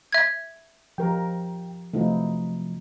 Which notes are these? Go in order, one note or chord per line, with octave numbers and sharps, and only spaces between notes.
E5 G#6
F3 G4 A#4 G5
C3 F3 F#3 A3 D#4 E4